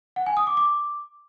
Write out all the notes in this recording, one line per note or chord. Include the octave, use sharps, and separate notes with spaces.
F#5
G#5
D#6
D6
D6